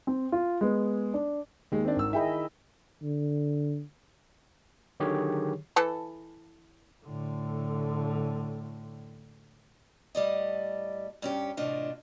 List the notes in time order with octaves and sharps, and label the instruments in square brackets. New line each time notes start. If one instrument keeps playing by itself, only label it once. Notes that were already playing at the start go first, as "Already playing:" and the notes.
[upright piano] C4
F4
G#3 B3
D4
[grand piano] D#2 G#3 [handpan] D#3
[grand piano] C4 D4
G#1 E6
[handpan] E4 G#4 D#5 [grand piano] E5 G5 B5
[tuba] D3
[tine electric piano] D3 D#3 F#3 G4 G#4 C#5
[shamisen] E3 A4 A5
[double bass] A2 D3
[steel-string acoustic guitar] A2 G3 D5 D#5
G2 C#4 G4
E2 A2 C3 D4 F4 D#5